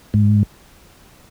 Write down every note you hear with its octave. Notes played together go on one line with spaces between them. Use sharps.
G#2